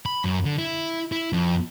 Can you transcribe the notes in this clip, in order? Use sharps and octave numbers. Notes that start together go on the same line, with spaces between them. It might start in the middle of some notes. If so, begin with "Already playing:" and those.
B5
F#2
D3
E4
E4
F2